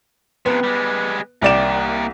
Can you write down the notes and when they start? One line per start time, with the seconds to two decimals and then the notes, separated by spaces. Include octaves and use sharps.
0.46 F2 C3 B3
0.64 G3 G#3
1.42 C2 A#3 D5 G5 E7